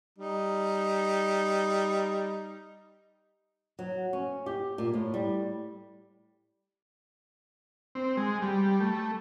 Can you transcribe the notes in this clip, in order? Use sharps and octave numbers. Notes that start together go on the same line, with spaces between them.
G3 D#4
F#3
C#4
G4
A#2
A2
G3
C4
G#3
G3
A3